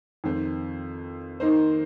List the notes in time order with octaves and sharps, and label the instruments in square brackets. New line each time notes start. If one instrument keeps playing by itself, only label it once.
[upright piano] F2 D#3 C4
D#3 A#3 D#4 C5